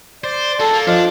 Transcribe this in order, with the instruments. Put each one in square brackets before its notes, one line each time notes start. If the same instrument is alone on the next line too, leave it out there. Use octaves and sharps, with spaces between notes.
[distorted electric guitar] C5 [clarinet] D5
[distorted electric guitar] F#4 G#4 [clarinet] A4 [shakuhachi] A5
[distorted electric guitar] A#3
[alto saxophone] F3 [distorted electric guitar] D4 [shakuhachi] D#5